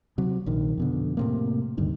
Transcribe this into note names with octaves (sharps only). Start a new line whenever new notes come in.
C3 F#3
A#1 D#3
F2 B2 D3
A2 C3 A#3
D2 G2 D3 D#3